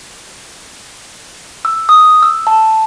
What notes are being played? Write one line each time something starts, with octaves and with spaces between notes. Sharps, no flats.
E6
D#6
E6
A5